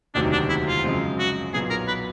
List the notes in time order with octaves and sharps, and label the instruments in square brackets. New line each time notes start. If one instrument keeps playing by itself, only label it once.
[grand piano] E1 D2 C3 D#3 F#3 [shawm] D4
[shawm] D4
E4
F4
[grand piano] F#2 C#3 F3 G#3 C4
[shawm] F#4
[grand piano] B1 A#2 F#3 B3 [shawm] G#4
[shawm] A#4
B4